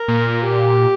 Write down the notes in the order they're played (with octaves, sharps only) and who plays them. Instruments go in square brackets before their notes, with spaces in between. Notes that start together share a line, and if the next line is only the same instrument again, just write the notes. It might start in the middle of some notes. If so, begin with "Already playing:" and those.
Already playing: [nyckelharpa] A#4
[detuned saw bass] A#2
[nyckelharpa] G4